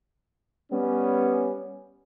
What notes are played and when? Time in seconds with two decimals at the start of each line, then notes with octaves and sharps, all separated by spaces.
0.71 G3 B3 C#4